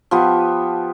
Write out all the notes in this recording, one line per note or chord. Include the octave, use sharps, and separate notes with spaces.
F3 B3 G4